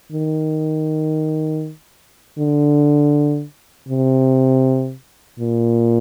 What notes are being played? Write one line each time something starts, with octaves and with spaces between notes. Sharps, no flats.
D#3
D3
C3
A#2